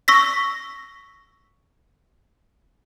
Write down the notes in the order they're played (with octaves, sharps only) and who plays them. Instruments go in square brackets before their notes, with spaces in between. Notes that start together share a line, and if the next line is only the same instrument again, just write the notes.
[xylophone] C#6 E6 A#6 B6